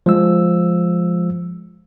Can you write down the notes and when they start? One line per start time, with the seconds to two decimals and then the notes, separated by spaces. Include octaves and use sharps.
0.06 F3 G#3 E6